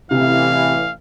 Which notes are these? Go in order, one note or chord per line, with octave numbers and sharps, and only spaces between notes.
A1 C3 E3 F5